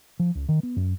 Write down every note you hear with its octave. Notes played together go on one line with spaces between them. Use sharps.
F3
C#2
D#3
B3
F#2